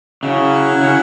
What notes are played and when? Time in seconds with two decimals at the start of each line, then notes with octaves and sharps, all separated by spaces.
0.23 C#3 F#3 C#4 E4
0.81 C#3